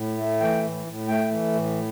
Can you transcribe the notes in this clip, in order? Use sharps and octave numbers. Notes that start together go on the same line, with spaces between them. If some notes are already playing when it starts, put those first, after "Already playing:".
Already playing: A2
A3
E3 G5
A2
A2
A3 G5
E3
A2